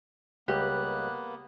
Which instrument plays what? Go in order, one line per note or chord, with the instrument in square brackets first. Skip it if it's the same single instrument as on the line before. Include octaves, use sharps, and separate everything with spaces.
[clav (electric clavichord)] C#2 G3 [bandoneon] A#3 B3 [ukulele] G4 [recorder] F#6